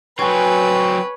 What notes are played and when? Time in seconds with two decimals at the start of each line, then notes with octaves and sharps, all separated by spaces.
0.19 F#3 C4 B4 C#5 G#5